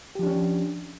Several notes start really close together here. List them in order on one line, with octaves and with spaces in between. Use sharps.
G4 F3 D4 C#4